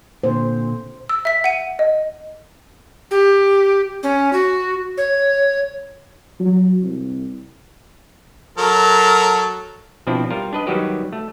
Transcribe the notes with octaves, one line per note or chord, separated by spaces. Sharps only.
A#2 D3 C5
E6
E5 B6
F#5 D#7
D#5
G4
C#4
F#4
C#5
F#3
C2
F#3 A4 A#4
B2 F3 C4 D4 E4
G3 F4 A#4
D4 B4 D#5
D#3 F#3 G3 F#4 G4 B4
A3